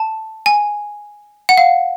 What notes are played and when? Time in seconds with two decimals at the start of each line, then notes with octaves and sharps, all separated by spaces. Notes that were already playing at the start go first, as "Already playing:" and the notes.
Already playing: A5
0.46 G#5
1.49 F#5
1.57 F5